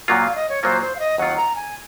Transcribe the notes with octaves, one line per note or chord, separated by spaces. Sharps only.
A#2 F#3 A#3 F4 F#5
F5
D#5
C#5
A#2 F#3 A#3 F4 C5
C5
F5
D#5
D#2 D#3 F#3 C4 F4 F#5
A#5
G#5